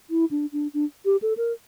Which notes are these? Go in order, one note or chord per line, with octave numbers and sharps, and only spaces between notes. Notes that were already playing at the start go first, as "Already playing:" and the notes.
E4
D4
D4
D4
G4
A4
A#4